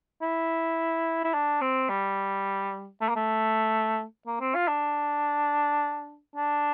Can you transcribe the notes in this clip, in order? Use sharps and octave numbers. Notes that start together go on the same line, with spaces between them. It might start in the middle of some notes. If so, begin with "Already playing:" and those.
E4
E4
D4
C4
G3
A3
A#3
A3
A#3
C4
F4
D4
D4